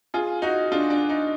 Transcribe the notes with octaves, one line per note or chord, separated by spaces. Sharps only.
F4 G#4
D#4 F#4
D4 F4
D4
D#4